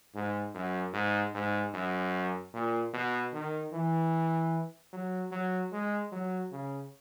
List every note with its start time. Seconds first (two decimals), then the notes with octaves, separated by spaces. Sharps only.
0.15 G#2
0.54 F#2
0.93 G#2
1.34 G#2
1.74 F#2
2.54 A#2
2.94 B2
3.33 D#3
3.73 E3
4.93 F#3
5.32 F#3
5.72 G#3
6.12 F#3
6.52 C#3